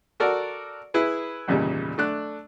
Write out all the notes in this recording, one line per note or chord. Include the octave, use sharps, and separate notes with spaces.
F#4 A4 A#4 D5
E4 G#4 B4
G#1 E2 A#2 C#3 G3
A3 D4 F#6